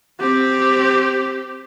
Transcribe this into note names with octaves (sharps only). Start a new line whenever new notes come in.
C4 G4